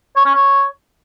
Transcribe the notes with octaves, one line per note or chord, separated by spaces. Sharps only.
C#5
C#4
C#5